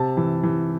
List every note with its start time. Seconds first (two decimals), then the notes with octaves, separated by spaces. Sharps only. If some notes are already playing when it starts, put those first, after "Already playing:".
Already playing: C3 A5
0.17 E3
0.43 E3